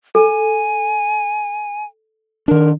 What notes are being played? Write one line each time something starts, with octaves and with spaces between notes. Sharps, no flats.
A4 G#5
D#3 D4 A#4